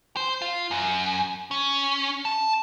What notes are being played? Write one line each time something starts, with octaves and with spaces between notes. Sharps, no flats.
C5
F4
F#2
C#4
A5